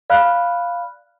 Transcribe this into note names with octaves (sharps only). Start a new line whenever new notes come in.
D5 F5 B5 F6 F#6